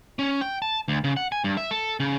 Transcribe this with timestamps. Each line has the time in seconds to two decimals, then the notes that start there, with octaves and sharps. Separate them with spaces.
0.19 C#4
0.41 G5
0.62 A5
0.88 D2
1.04 C#3
1.17 F#5
1.32 G#5
1.44 G2
1.57 E5
1.71 A4
2.00 C#3